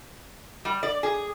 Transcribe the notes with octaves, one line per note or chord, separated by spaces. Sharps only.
G3
D5
G#4